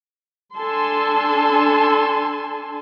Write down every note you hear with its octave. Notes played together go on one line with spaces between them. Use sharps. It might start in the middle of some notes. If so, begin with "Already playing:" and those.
D4 A4 G#5 A5 C6